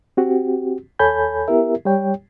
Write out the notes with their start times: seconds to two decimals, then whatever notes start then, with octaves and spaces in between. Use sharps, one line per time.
0.17 C4 F#4 G4
0.99 D#2 A4 C#5 G#5 B5 G6
1.48 B3 E4 G4 A#4 E5
1.85 G3 G4 C#5 G5